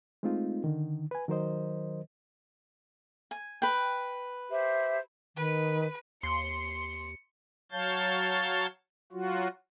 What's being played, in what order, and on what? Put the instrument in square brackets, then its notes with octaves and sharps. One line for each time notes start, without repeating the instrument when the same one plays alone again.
[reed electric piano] G#3 A3 C4 D#4 F4
D3 D#3
B4 G#5
D#3 F#3 A#4 C5 D#5
[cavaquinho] G#5
B4 G5
[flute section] G4 C5 E5
[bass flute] D#3 [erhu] B4
[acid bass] D#2 [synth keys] C6 [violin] C#7
[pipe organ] F#3 C#5 F5 A5 G6 A6
F#3 F4 F#4